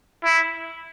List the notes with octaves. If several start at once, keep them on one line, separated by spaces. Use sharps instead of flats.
E4